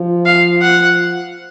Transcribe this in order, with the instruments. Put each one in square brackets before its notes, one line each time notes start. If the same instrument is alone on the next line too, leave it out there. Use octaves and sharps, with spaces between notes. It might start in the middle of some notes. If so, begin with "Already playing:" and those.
Already playing: [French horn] F3
[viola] F5
F#5